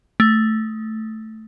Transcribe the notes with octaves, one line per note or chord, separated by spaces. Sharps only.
A3